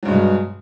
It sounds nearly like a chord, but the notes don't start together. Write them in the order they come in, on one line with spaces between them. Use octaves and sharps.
F#3 G2 G#3 B2